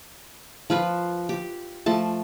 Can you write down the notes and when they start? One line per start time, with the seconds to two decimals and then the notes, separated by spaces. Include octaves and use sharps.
0.70 F3 F4 B4
1.29 G4
1.86 F3 A3 A5